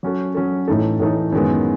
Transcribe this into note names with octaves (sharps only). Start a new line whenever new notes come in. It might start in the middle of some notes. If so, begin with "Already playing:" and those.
F#3 C#4 F#4 A4
F#3 C#4 F#4 A4
A2 E3 A3 D#4 A4
A2 E3 A3 D#4 A4
F#2 D#3 G#3 B3